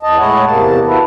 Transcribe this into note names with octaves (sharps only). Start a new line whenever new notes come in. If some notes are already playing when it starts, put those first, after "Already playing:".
E2 D#5 A5
A2 G#3 E4 C#5 D#5 F#5
E2 C3 A#3 A5
E4 F#4 A4 B4